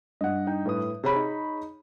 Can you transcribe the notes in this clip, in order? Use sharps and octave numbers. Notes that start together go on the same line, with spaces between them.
G2 D#5 F#5
D#4 G5
A2 B4 D#6
C3 G#4 C#5 B5
D#4